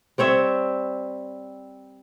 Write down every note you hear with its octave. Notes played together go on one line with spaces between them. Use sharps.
G3 C4 C#5 E5